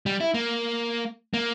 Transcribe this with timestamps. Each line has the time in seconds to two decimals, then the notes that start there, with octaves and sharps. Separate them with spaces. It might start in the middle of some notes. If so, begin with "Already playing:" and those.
0.06 G3
0.20 E4
0.34 A#3
1.34 A#3